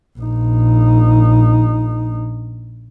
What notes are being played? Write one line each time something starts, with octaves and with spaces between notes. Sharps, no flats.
A#1 D#4